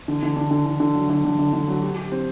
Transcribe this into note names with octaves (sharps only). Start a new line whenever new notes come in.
D3
D3
D3
D3
D3
D3
F#3
D3
D3
D3
D3
F#3
G4
G4
C4